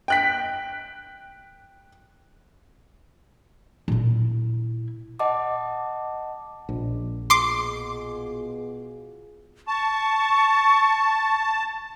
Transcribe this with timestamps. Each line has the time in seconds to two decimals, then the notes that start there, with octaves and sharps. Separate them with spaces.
0.08 G5 F#6 B6
3.88 A#2 E4
5.19 D#5 F#5 A5 D6
6.69 A#1
7.30 B2 F4 G#4 C6 D6 C7
9.68 A5 C#6